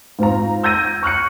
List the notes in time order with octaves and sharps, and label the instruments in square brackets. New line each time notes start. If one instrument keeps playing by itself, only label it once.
[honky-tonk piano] G#2 C4 F4 A#5
E6 G6 G#6 A#6 D#7
C#6 F6 F#6 C#7